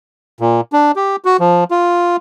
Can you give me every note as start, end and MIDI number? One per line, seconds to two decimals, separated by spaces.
0.40 0.61 46
0.73 0.92 62
0.96 1.16 67
1.25 1.37 66
1.40 1.64 53
1.71 2.16 65